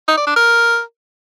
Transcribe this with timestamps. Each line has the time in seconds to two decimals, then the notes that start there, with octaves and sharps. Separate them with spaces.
0.08 D#4
0.17 D5
0.27 D4
0.36 A#4